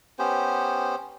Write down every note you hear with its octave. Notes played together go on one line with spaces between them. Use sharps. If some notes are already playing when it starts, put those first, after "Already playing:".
B3 C#4 G4 C5